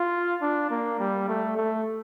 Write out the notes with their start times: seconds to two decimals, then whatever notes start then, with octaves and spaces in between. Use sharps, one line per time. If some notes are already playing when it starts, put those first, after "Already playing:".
Already playing: F4
0.42 D4
0.71 A#3
0.99 G3
1.28 A3
1.57 A3